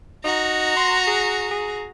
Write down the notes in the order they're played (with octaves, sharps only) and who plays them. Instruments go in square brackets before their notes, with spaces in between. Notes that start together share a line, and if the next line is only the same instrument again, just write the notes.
[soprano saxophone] D#4 [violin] F#4 A#5
[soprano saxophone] C6
G#4
G#4